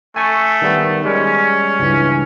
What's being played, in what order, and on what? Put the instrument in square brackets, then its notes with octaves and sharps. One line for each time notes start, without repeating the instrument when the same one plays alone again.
[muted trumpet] A3 [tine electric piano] G#5 C#6
[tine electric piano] D#3 G3 B3
[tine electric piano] G3 G#3 [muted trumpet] C#4
[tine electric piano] C#2 G2 E3